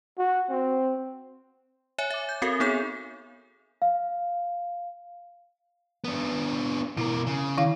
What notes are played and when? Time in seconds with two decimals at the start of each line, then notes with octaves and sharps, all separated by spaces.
0.18 F#4
0.50 C4
1.98 C#5 E5 G#5
2.10 E5 D6
2.29 G6
2.42 C4 F#4 A4 A#4 F5
2.60 B3 D#4 G#4 A4 C#5 G6
3.82 F5
6.04 B3 D4
6.97 B2 E4 A#4
7.27 C#3
7.58 D#3 E4 F5